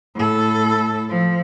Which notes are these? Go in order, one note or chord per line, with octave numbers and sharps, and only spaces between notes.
A2 A4
F3